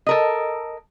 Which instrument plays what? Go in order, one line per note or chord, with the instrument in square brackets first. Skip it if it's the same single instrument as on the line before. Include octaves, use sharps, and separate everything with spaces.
[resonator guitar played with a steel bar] A4 A#4 D#5